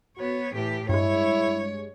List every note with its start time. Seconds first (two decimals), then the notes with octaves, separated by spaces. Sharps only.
0.17 B3 F#4 C#5
0.54 A2 E3 G4
0.89 G2 G#3 E4 C#5